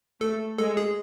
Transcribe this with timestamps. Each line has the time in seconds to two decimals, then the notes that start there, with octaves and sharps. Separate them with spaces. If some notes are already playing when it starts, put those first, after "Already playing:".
0.21 A3 A4
0.58 G#3 A4
0.77 G#4